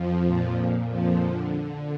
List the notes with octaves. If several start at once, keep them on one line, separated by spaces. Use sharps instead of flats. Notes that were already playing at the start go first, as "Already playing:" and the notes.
Already playing: F2 F3
A#2
F2 F3
D3